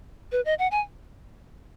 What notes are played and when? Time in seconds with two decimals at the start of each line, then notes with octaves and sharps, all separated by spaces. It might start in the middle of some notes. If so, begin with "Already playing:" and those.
0.32 B4
0.45 D#5
0.59 F#5
0.71 G#5